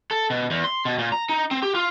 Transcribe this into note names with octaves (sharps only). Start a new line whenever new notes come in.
A4
B2
E2
C6
B2
A#2
A#5
D#4
C4
G4
F4